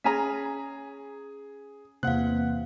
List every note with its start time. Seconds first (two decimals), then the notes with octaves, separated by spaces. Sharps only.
0.04 C#4 G#4 G#5 A#5 B6
2.03 E2 C3 A#3 F5 F#5 F#6